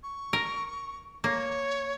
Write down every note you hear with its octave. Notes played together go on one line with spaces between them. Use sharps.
C#6
A#4
A#3 C#5